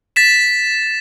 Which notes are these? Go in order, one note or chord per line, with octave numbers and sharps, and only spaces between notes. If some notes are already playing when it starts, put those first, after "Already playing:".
A6 B6 E7